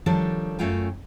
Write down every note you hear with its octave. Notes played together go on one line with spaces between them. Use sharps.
D#3 F3 G3 D4 A4 C#5
F#2 A3 C#4 F4 G5 G#5